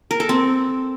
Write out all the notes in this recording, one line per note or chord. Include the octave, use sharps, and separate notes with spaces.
A#4
A4
C4